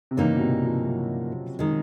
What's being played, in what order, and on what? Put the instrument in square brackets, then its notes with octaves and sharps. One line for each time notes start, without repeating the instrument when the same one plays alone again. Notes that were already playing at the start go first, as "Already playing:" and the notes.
[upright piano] C3
[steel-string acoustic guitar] G2 E3 G3 A#3 D#4 [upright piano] C#3
[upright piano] B2
C3
F3
F#3
[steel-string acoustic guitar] D#3 G#3